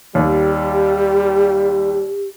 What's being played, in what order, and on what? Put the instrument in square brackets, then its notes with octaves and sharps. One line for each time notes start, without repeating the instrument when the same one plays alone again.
[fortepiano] D#2 [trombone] G3 [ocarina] G4